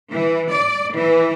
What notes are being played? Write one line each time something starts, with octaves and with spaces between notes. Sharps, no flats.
E3
D5
E3